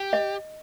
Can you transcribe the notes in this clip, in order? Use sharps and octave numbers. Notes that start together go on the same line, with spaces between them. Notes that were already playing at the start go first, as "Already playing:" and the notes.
Already playing: G4
D#5